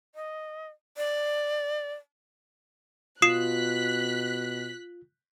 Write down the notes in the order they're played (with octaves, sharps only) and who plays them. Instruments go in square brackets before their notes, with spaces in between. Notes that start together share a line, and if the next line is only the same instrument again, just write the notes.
[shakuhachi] D#5
D5
[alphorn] B2 [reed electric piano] F4 [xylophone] D#6 C7 E7 [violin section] F#6 B6